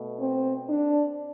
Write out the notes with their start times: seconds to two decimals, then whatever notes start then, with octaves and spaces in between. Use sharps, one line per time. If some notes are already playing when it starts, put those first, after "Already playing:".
Already playing: B2 A3
0.20 C4
0.69 D4